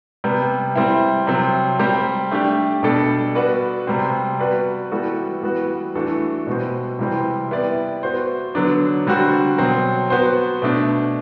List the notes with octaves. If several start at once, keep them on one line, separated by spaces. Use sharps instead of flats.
C3 G3 B3
G3 C4 E4
C3 F#3 C4
G3 C4 G4
A3 D4 G4 D5
B2 G3 D4 A4 D5
B3 F#4 B4 D5
C3 G3 C4
B3 F#4 B4 D5
E3 G3 B3 F#4 A4
E3 G3 B3 F#4
E3 A3 D4 F#4 A4
B2 G3 B3 F#4 C5
C3 E3 G3 C4 G4
B3 E4 G4 D5
B3 F#4 C5
D3 F#3 B3 D4
D3 G3 C4 F#4
B2 F#3 C4
B3 F#4 C5
B2 A3 D4